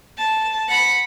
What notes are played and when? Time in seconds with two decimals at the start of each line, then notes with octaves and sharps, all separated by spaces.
0.18 A5
0.69 F#5 B5